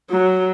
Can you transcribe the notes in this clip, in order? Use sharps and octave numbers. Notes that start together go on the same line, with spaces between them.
F#3